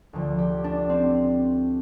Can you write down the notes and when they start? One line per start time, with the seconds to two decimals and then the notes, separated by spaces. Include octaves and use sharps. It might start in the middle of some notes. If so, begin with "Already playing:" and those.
0.13 D2 D3 F3
0.38 G4
0.64 D4
0.89 C4